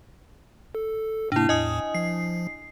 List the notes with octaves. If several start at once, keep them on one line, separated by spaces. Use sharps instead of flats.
A4
G#2 C3 A#3 D4 E4
E2 A2 D#5 G#5 D#6
F3 C7